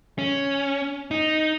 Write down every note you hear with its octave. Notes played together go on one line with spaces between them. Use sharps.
C#4
D#4